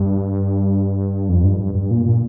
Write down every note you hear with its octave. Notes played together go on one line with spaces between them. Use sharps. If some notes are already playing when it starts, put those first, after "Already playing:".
Already playing: G2
F2
G2
G2
G2
A#2
A#2